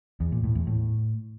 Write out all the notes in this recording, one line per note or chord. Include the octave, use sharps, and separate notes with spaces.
E2
A#2
A2
E2
A2